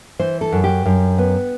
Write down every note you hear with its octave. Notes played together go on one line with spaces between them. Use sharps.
E3 C5
A4
F#2
G4
F#2
B3